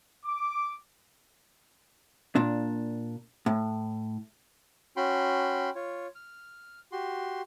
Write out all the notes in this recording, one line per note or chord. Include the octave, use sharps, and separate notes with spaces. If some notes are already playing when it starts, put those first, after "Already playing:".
D6
A#2 D4
A2
C#4 F#4 G5 B5 C6
F4 C#5
F6
F#4 G4 C6